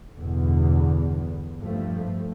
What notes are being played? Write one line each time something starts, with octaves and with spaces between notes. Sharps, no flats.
E2 G2 B2 D3
G2 F3 A3